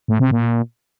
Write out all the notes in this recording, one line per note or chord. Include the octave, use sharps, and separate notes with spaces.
A2
C3
A#2